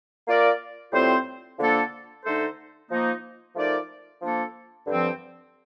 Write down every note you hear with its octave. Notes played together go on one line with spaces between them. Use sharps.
A#3 F4 A#4 D5
A2 G3 C4 F4 C5
D3 F3 A#3 D4 A4
D3 A3 D#4 A4 C5
F3 A#3 D#4
F3 A3 D#4 A#4 D5
F3 A#3 D4 A4
G2 D3 F3 C4